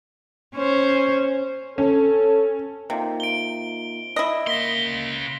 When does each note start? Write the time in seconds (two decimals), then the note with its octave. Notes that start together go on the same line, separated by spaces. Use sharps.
0.56 C#4 C5
1.78 C#4 A4
2.90 C3 A#3 D#4 F4
3.20 D7 G7
4.16 E4 D#5
4.47 C#3 A#3 C6 A#6 B6 G7